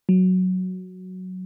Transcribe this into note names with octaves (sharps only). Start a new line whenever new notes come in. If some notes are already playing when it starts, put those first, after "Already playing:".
F#3